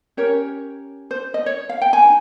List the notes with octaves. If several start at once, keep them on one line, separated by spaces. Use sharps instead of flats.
C#4 G4 A#4 C#5
C5
D#5
C#5
F5
G5
G#5
D#4